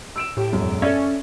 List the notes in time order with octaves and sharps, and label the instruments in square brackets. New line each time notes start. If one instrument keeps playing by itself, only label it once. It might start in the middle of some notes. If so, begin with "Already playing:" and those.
[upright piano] E6 D7 E7
[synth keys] A2 D7 [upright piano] G4
[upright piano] E1 F#2
[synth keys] C#4 A4 [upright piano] D5 E5 G#6